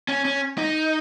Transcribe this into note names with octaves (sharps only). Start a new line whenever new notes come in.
C#4
C#4
D#4